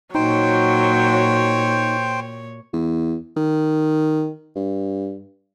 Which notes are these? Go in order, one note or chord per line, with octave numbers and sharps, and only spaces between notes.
A#2 F#3 D#4 C5 C#5 G5
E2
D#3
G2